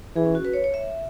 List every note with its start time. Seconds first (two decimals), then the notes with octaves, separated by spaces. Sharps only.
0.16 E3 G#4
0.25 C#4
0.35 F#4
0.45 B4
0.54 C#5
0.64 C#5
0.74 E5